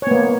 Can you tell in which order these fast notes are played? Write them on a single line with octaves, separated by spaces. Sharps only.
C#5 B3 A#3